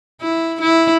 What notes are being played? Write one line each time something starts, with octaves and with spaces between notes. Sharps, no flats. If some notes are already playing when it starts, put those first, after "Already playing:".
E4
E4